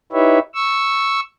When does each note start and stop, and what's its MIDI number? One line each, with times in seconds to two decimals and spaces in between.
0.13 0.39 63
0.13 0.39 64
0.13 0.39 67
0.13 0.39 71
0.13 0.39 73
0.13 0.39 76
0.54 1.20 85
0.54 1.20 88